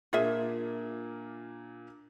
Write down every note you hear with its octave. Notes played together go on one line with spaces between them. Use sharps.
A#2 A#3 D4 F4 G#4 E5